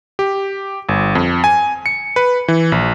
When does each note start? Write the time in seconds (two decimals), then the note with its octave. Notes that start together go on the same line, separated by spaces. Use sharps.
0.19 G4
0.89 G1
1.15 F2
1.44 G#5
1.86 C#7
2.16 B4
2.48 E3
2.72 A#1